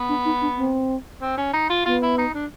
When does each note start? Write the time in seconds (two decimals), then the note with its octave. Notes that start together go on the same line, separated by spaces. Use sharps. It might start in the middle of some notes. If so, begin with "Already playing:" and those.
Already playing: B3
0.09 D4
0.25 D#4
0.41 D4
0.57 C4
1.21 C4
1.37 C#4
1.53 D#4
1.70 F4
1.86 B3 F4
2.02 E4
2.18 D#4
2.35 D4